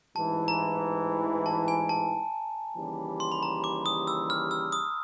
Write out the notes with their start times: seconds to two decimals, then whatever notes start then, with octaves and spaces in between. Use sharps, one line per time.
0.16 A1 G#2 E3 A5
0.48 A#5
1.46 A5
1.68 G#5
1.89 A5
2.77 D#2 C#3 E3 G3
3.20 C6
3.32 B5
3.43 A#5
3.64 D6
3.86 D#6
4.07 E6
4.30 F6
4.51 E6
4.72 D#6